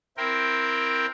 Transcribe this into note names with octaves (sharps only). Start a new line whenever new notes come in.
C4 E4 A#4 G5